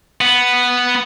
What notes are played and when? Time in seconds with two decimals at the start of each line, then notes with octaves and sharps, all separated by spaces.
0.21 B3